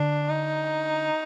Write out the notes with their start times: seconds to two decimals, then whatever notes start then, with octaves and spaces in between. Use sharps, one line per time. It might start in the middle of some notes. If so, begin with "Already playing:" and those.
Already playing: D3 D4
0.30 D#4